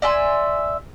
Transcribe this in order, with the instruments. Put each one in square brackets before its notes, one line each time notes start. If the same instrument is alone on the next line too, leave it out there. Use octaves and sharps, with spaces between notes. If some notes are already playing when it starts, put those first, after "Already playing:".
[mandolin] D5 E5 G#5 C6